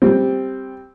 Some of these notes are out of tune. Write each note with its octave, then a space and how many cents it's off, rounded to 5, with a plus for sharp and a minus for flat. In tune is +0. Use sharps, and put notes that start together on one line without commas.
G3 +5 C4 +0